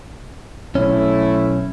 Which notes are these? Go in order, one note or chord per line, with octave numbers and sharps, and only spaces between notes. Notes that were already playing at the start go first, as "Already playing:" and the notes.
B1 A3 C#4 E4